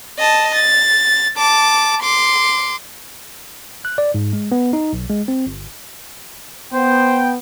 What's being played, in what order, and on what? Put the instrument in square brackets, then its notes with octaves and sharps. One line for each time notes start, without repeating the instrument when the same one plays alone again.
[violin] D#5 A5
A6
A5 D6
C6 D6
[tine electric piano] F#6
D5
G#2
G#3
B3
D#4
B1
G#3
C4
G1
[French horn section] B3 [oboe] C5 [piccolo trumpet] G5